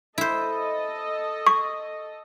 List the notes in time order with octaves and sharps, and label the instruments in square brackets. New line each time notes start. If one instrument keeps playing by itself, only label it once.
[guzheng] E4 C5 [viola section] A4 D#5
[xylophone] C#6